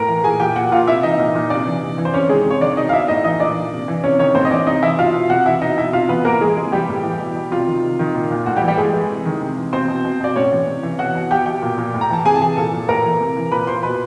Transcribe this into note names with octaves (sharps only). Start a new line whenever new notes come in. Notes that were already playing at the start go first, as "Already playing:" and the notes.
Already playing: A2 A#4 A#5
E3
A#2 G#4 G#5
A#2 G4 G5
A#2 F#4 F#5
A#2 F4 F5
C3 E4 E5
E3 D#4 D#5
A#2
A#2
C3 D4 D5
E3
C3
E3
C5
C3 C#4 C#5
D#3 G#3 G#4
C3 C#5
D#3 D4 D5
B2 D#4 D#5
F5
B2 E4 E5
A2 D#4 D#5
E3 D#4 D#5
A#2 D4 D5
A#2
C3
E3
C3 C#4 C#5
D#3 C#4 C#5
A2 C4 C5
D#5
E3 D4 D5
C3 D#4 D#5
E3 E4 E5
B2 F4 F5
B2
C3 F#4 F#5
E3 E4 E5
B2 D#4 D#5
B2 E4 E5
C3 F4 F5
E3 B3 B4
A2 A#3 A#4
E3 G#3 G#4
C3 G#3 G#4
E3 G3 G4
A2
E3
B2
B2
C3 F4
D#3
C3
D#3
A#2
A#2
A2 F#4
G3 G4
E3
G3 G4
A2 G#3 G#4
E3
C3
D#3
C3
E3
B2 C4 C5
B2
B2
B2 D5
A2 C#4 C#5
E3
C3
E3
B2 F#4 F#5
B2
B2 G4 G5
B2 G4 G5
A#2
A#2
A2
A#5
E3 A5
C3 G#4 G#5
A5
E3 G#4 G#5
A#2 A4 A5
A#2
A2 A#4 A#5
E3
C3
E3
A#2 B4 B5
A#2 C5 C6
B2 B4 B5